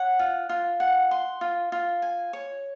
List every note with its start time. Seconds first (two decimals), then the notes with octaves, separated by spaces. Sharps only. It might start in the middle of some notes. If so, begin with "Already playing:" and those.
Already playing: C#5 F#5
0.19 F4
0.49 F4
0.80 F#5
1.11 C6
1.41 F4
1.72 F4
2.02 G#5
2.33 C#5